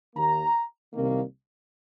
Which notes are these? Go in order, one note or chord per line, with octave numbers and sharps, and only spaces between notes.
D#2 D#3 A#3 A#5
C2 C3 D#3 A#3